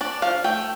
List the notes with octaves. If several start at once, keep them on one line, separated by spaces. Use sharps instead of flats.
D4 D5
F3 F5
A3 G5